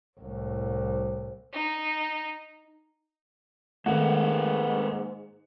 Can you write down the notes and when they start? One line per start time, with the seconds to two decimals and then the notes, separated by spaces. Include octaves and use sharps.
0.19 C2 A2
1.53 D#4
3.86 G#2 D#3 A3 A#3 D#4 A#4 B4 F#5